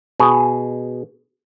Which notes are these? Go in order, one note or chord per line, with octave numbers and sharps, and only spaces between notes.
B2 G#4